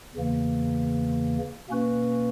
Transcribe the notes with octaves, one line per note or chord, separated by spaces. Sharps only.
E2 C#3 E3 A#3
B2 A#3 C#4 F#4 B4